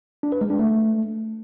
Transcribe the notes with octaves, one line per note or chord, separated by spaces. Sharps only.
D4
B4
G#3
D4
A3